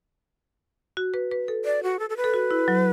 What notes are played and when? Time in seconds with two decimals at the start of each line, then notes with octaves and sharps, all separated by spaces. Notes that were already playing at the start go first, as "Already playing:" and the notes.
0.97 F#4
1.14 B4
1.32 B4
1.48 A4
1.65 D5
1.83 F#4
1.99 A4
2.10 A4
2.17 B4
2.24 A4
2.34 F#4
2.51 E4
2.68 F#3